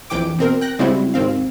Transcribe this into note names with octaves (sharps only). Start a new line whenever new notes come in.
A#1 F2 E3 G5 D6 D7
B2 C4 A#4
G5 F#6 A#6
C#3 G3 G#3 C4 E4 F#4
G#1 D#2 C4 F5